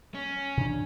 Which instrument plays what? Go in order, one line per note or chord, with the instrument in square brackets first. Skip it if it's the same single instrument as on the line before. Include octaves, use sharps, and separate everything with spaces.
[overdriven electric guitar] C#4
[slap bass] C3 E3 D4